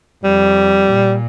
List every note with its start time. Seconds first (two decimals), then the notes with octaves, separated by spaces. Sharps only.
0.24 F2 G3
0.90 A#2